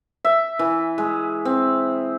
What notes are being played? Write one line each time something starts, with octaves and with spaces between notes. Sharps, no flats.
E5
E3
G#3
C4